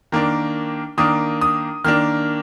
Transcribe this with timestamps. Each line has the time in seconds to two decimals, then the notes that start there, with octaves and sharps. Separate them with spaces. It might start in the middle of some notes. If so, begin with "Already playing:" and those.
0.12 D#3 A#3 D4
0.98 D#3 A#3 D4 D#6
1.41 D#6
1.84 D#3 A#3 D4 F6